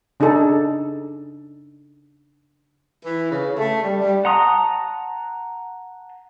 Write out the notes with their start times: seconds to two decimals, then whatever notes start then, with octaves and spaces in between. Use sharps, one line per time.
0.20 C#3 D4 D#4 G#4 A4
3.05 E3
3.31 C#3
3.57 A3
3.83 G3
4.01 G3
4.25 F#5 A5 A#5 C6 D#6